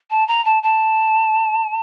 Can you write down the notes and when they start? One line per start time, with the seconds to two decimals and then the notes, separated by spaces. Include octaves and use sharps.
0.10 A5
0.28 A#5
0.45 A5
0.63 A5